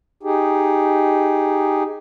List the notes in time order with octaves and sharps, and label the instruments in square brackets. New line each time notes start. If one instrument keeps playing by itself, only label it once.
[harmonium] D#4 G4 G#4